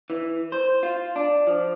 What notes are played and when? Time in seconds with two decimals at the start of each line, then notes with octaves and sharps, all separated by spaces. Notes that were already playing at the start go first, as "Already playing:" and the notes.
0.10 E3
0.52 C5
0.83 F4
1.16 D4
1.47 F3